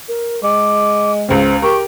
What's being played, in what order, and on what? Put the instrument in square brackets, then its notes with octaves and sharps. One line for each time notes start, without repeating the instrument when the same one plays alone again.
[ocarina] A#4
[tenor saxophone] G#3 [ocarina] D6
[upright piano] C#2 C#3 [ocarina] C5
[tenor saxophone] G4 [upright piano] A#4 [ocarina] C#6